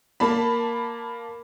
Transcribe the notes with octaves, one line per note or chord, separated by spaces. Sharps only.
A#3 A5 B5